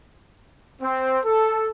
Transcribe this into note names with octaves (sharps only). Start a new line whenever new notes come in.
C4
A4